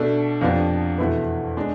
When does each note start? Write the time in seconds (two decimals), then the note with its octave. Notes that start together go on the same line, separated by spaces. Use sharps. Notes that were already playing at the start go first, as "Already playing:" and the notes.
Already playing: B2 A3 D4 A4
0.41 F2 C3 F3 B3 D4
0.98 E2 B2 A3 E4 B4
1.56 G#3 D4